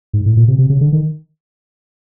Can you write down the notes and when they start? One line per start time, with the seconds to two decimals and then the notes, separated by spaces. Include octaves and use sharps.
0.13 G#2
0.26 A2
0.37 A#2
0.48 C3
0.58 C3
0.70 C#3
0.81 D3
0.92 D#3